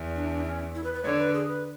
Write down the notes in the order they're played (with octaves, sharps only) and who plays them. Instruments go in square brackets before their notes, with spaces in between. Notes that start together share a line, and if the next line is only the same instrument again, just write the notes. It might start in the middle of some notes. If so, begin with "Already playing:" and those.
Already playing: [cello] E2
[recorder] D4
D4
C#4
E4
B4
B4
[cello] D3 [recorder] C#5
[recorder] B4
G#4
B4